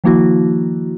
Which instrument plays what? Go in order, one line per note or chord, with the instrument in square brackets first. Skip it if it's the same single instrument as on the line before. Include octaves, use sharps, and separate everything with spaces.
[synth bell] D#3 F3 A#3 E4 F#4